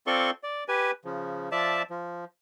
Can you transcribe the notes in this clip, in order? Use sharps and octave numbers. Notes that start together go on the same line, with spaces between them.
C4 F4 A4 D5 C6 C#6
D5
G4 B4 G#5
C#3 F3
F3 D5 E5 A5
F3